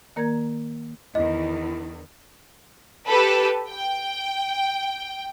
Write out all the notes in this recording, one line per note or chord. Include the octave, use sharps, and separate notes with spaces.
D#3 A#3 A#4 D5 A#5 G#6
E2 D#3 E4 D#5
G4 A4 B4
G5